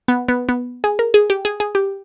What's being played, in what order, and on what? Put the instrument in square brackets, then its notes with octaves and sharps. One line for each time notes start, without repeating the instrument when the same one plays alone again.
[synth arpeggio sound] B3
B3
B3
G#4
A#4
G#4
G4
G#4
G#4
G4